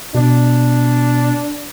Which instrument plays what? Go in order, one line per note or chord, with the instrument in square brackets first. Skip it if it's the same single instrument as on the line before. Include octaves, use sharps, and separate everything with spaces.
[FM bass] B2 [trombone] D4